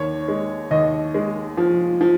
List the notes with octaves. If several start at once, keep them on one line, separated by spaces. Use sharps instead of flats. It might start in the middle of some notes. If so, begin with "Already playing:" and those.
Already playing: D#2 C#5
G#3
D#2 D#5
G#3
F3
F3